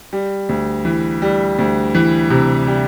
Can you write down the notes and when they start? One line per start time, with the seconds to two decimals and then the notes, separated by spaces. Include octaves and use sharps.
0.13 G3
0.49 D2
0.85 E3
1.22 G3
1.58 D2
1.95 E3
2.30 C3
2.67 G3